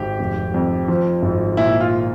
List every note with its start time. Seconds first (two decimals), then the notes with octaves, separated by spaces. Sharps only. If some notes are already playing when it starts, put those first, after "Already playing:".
Already playing: G#1 G4
0.19 F1
0.54 F2
0.88 F3
1.22 G#1
1.57 A#2 E4
1.80 F4